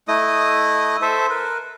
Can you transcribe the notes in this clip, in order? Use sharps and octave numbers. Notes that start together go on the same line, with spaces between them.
A3 E4 D#5 D#6
A4 C5 E5
A#4 B4